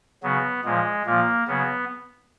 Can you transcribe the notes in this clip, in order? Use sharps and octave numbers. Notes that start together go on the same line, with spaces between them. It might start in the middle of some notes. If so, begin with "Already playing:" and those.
C#3 F#3 B3
A#2 F3 G#3
A#2 F3 A#3
C#3 F#3 B3